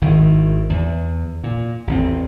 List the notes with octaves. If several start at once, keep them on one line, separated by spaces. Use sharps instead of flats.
G#1 A2 D#3
E2
A#2
A1 E2 C4